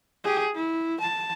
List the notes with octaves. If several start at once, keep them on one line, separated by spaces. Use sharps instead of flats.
G4 G#4
E4
A5